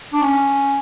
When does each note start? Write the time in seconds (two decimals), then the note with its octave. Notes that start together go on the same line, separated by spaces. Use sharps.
0.13 D4
0.21 C#4